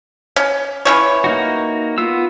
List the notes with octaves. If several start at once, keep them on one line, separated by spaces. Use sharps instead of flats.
C#4
E3 C#4 C#5
A#3 D#4 F#4
B3 F4 E6